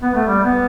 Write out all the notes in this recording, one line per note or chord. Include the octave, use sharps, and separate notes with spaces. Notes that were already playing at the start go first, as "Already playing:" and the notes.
B3
A3
G3
B3